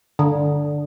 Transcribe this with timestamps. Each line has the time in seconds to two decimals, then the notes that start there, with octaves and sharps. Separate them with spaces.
0.19 D3